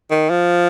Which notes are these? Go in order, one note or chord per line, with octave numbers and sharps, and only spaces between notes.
D#3
F3